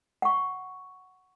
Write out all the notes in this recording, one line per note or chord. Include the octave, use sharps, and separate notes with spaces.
F#5 C#6